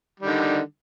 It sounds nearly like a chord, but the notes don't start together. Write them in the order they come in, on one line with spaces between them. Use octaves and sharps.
G3 D#3 D3